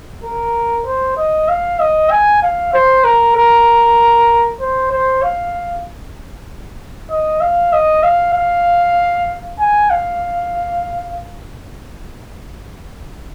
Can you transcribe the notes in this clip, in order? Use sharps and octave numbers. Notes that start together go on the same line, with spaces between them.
A#4
C5
D#5
F5
D#5
G#5
F5
C5
A#4
A#4
C5
C5
F5
D#5
F5
D#5
F5
F5
G#5
F5